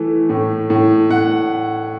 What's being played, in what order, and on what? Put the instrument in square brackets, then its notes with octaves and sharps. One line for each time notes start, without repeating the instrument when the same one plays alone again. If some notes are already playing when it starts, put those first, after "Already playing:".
Already playing: [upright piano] E3 A3
A2
A2
A2 F#5